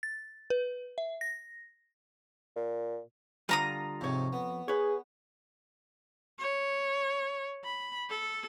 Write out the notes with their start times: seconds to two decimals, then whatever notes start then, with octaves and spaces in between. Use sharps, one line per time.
0.03 A6
0.50 B4
0.98 E5
1.21 A#6
2.56 A#2
3.49 D3 G3 F4 A#5 D#6
4.01 F2 G#2 C3 C#5
4.33 B3
4.68 G#4 B4 C#5
6.39 C#5
7.64 B5
8.10 A4